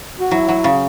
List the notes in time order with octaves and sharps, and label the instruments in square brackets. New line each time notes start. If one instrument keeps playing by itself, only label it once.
[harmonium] F#4
[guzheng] F#3 [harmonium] E4
[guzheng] F#3
C#3